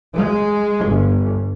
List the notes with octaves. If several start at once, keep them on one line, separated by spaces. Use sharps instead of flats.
G#3
G1